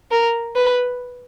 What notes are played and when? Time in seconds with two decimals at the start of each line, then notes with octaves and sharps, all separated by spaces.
0.11 A#4
0.56 B4